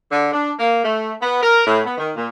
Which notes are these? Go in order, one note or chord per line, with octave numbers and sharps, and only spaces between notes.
D3
D4
A#3
A3
B3
A#4
A2
B3
D#3
A#2